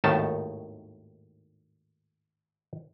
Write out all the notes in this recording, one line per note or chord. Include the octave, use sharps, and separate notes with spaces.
G#1 D#2 A2 D#3 A3 A5